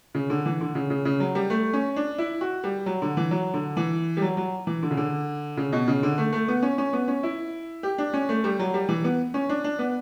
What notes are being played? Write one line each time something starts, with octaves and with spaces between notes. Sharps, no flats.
C#3
D3
E3
D3
C#3
C#3
C#3
F#3
G3
A3
C#4
D4
E4
F#4
G3
F#3
D3
E3
F#3
D3
E3
G3
F#3
F#3
E3
D3
C#3
D3
C#3
B2
C#3
D3
A3
A3
B3
C#4
C#4
B3
C#4
E4
G4
D4
C#4
A3
G3
F#3
G3
E3
B3
C#4
D4
D4
B3